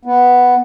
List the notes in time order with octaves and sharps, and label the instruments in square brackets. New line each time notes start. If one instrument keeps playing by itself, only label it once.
[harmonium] B3